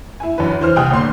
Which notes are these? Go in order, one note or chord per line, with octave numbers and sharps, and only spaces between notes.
E4 G#5
F#2 E3 B4
E3 C5 F6
C2 G5 D#6 F#6
G1 A#2 C6